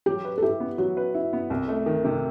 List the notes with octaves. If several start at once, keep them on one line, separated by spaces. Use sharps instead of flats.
F#3 G4
B4
A4
E4 G4
B3
F#3 F#4
B4
E4
B3
C2
A3
D#3
C3